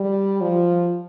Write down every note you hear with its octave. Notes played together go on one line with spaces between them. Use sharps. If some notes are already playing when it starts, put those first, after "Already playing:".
Already playing: G3
F3